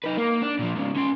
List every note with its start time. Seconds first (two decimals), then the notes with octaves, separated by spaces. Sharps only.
0.04 D#4 B4
0.18 A#3
0.42 D4
0.59 A#2 F3
0.76 G#2 C#3
0.97 C#4 C6